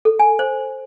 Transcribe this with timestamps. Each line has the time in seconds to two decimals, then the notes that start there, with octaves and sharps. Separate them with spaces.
0.05 A4
0.19 G#5
0.39 C5